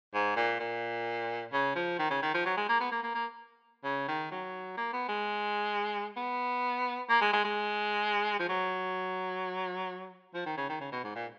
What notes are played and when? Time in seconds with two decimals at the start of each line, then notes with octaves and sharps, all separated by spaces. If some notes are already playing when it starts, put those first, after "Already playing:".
0.14 G#2
0.36 A#2
0.60 A#2
1.52 C#3
1.76 F3
1.99 D#3
2.10 C#3
2.22 D#3
2.34 F3
2.45 F#3
2.57 G#3
2.69 A#3
2.80 B3
2.92 A#3
3.03 A#3
3.15 A#3
3.84 C#3
4.08 D#3
4.31 F#3
4.77 A#3
4.93 B3
5.08 G#3
6.16 B3
7.09 A#3
7.21 G#3
7.33 G#3
7.44 G#3
8.39 F3
8.49 F#3
10.34 F3
10.46 D#3
10.57 C#3
10.69 D#3
10.80 C#3
10.92 B2
11.04 G#2
11.15 A#2